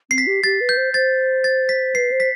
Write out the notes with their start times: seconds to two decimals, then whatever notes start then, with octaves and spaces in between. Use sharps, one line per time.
0.11 C4 C7
0.18 B6
0.27 G4
0.44 G4 A6
0.61 B4
0.69 G6
0.77 C5
0.94 C5 A6
1.44 A6
1.69 B6
1.95 B4 C7
2.11 C5
2.20 B6